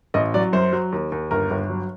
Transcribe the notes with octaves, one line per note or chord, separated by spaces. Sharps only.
A1 D#5
F#3 D5
F#2 C5
F#3
D#2
D#2
G1 A#4
G1
F#3